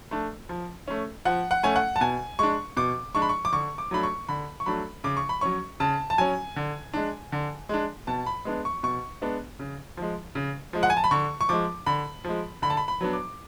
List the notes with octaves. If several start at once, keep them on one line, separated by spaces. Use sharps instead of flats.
A3 D4
F3
A3 C#4
F3 F#5
F#5
A3 C#4 G#5
F#5
A5
B2 G#5
G#3 D4 C#6
B2 D6
G#3 D4 C#6
B5
C#6
D6
D3 C#6
D6
F#3 A3 D4 B5
C#6
D3 B5
C#6
F#3 A3 D4 B5
C#3 D6
C#6
B5
F#3 C#4 C#6
C#3 A5
A5
F#3 C#4 G#5
D3
G#3 D4
D3
G#3 D4
B2 A5
B5
G#3 B3 D4
C#6
B2 C#6
G#3 B3 D4
C#3
F3 G#3
C#3
F3 G#3
F#5
G#5
A5
B5
D3 C#6
C#6
F3 G#3 D6
D3 B5
F3 G#3
D3 B5
A5
B5
B5
F#3 B3 D4
D6